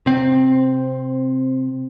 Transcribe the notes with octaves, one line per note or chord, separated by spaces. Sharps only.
C3 C4